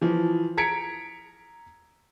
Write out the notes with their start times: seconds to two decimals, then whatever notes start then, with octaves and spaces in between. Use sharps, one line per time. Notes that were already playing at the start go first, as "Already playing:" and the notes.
0.01 E3 F3
0.57 A#5 G#6 B6 C#7 D7